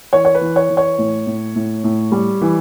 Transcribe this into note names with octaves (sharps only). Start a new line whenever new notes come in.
E3 C#5
C#5
B4
E3
C#5
E3
C#5
A2
A2
A2
A2
G3
E3